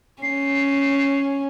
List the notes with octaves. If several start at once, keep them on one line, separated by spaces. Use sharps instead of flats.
C#4 C7